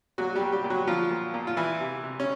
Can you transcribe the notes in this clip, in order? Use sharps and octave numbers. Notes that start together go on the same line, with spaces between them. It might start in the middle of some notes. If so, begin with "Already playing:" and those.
A#2 F#3 F#4
G3 G4
A#2
G3 G4
A#2
F#3 F#4
A#2 F3 F4
A#2
A#2
F4
E3 E4
C3
C3
C#4